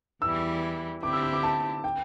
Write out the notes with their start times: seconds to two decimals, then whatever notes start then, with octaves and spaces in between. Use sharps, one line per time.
0.22 E2 E3 G3 E4 E6
1.03 D3 C4 E4 G4 D6
1.13 E6
1.23 E6
1.33 D6
1.43 A5
1.84 G5